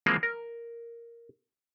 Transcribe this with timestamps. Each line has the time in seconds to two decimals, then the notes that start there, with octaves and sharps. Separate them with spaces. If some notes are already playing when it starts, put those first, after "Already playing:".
0.06 E3 F3 G#3 A#3 C4
0.23 A#4